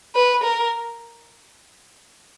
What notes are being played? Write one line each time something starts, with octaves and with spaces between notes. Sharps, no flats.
B4
A#4